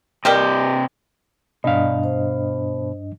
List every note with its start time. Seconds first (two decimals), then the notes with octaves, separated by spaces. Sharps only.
0.25 C3 G3 A#3 G4 D#5
1.64 G2 B2 D4 D5 D#5 F5
2.04 C5